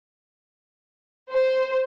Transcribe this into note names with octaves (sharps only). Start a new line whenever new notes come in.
C5